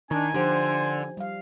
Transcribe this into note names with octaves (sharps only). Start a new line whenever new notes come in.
D#3 D4 D#4 G#5
D3 F3 G4 C5
G3 F5